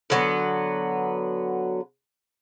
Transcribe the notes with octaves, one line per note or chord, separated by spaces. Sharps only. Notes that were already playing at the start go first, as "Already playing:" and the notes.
D3 F#3 B3